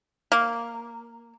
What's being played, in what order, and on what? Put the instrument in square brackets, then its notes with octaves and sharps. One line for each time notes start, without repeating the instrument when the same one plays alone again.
[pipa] A#3